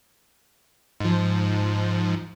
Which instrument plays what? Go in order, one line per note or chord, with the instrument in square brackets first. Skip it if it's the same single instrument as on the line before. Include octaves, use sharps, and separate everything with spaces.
[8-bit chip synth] G#2 F3